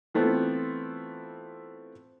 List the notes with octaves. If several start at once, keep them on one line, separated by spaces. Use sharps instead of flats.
E3 A3 B3 C4 F4